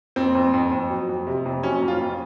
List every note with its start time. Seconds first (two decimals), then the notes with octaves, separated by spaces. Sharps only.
0.16 F2 C4
0.35 F2
0.54 F2
0.71 F2
0.90 F#3
1.09 F2
1.27 C3
1.45 F2
1.63 F#3 C#4
1.82 F2
1.88 F4
2.00 F2